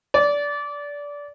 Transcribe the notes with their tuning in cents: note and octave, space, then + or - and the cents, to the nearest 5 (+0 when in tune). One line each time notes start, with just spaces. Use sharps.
D5 -20